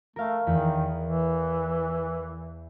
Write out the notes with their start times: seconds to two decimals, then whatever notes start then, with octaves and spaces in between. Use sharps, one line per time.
0.16 A3 A#4 F5
0.47 E2 D#3
1.04 E3